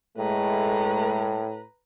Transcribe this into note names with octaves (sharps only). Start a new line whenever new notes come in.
A2 G#3 A3 B4 A#5